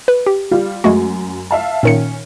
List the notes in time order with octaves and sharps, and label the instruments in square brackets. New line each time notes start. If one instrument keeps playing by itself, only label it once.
[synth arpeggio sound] B4
G4
[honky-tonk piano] G3 F4
[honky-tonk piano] F#2 [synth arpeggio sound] G#3 A3 F#4
[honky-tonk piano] E5 F5 A5
[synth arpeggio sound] A#2 D#3 C#7 [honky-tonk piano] C#4